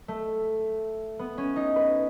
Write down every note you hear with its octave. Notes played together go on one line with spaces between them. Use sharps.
A3
B3
C#4
D#4
B4